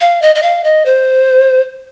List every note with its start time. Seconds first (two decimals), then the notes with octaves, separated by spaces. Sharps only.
0.01 F5
0.22 D#5
0.35 D#5
0.43 F5
0.64 D#5
0.86 C5